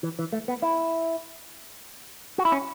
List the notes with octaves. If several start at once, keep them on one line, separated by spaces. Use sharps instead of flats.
E3
E3
A3
B3
E4
F#4
E4
C#4